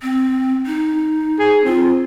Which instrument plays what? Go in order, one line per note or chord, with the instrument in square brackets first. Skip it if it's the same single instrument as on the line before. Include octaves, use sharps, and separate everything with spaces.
[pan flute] C4
D#4
[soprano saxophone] G#4
[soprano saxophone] C4 [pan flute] F4